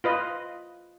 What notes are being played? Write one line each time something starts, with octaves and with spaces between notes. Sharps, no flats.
F4 B4 D#5